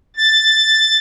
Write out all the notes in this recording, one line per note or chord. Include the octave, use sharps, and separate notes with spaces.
A6